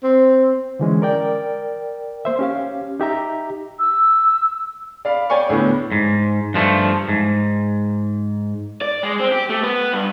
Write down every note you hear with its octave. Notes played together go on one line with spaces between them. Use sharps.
C4
D3 E3 G#3 C#4
A#4 D5 G5
A#3 C5 E5
C#4 G4 F5
D#4 G4 E5 A#5
E6
D5 F5 B5
C#5 D5 G5 G#5 C#6
D2 A2 B3
G#2
G2 F3 G#3 A3
G#2
D5
G#3
C4
G4
A3
B3
G2